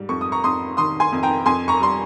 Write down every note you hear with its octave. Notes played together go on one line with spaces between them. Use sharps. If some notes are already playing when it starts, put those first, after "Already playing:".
Already playing: G#2 G3
F2 C#6
D#6
A#5 C#6
F2 C6 D#6
D#3 C6 D#6
G#5 C6
F2
G5 A#5
F2 G#5 C6
A#5 C#6
G3 C6